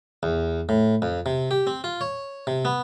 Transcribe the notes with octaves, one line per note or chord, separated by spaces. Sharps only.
E2
A2
F2
C3
G4
C4
F4
C#5
C3
B3